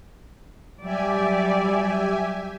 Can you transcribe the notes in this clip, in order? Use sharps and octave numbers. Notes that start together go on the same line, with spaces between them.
F#3 G3 G4 D5 E5 G#5